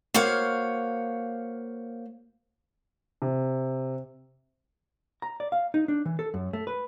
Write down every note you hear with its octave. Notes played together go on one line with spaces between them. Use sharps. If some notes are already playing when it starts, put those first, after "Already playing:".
A#3 F#4 C5 C#5 F5
C3
A#5
D5
F5
D#4
D4
E3
A4
F#2
A3
B4